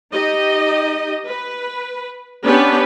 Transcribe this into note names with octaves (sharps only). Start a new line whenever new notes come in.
D#4 G4 D#5
B4
B3 C#4 D4 G4 B4